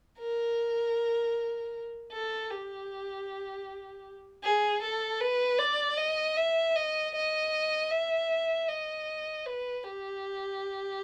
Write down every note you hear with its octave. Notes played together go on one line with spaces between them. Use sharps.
A#4
A4
G4
G#4
A4
B4
D5
D#5
E5
D#5
D#5
E5
D#5
B4
G4